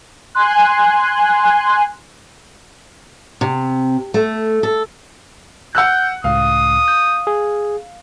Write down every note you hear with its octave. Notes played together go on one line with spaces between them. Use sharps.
G#5 C6 F#6
C3
A3
A4
F#5 E6 F#6 G6
C#2 A2 F5 D#6
G6
G#4